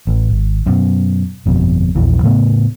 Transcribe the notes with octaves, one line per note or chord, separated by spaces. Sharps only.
A1
G#1
F#2 B2
G1 F2 B2
A#1 E2 E3 F3
A2 C#3 A3 B3